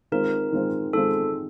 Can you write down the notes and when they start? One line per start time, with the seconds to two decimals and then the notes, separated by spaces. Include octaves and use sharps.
0.12 D#3 G#3 C4 F4 A#4
0.52 D#3 G#3 C4 F4
0.93 D#3 G#3 C4 F4 A4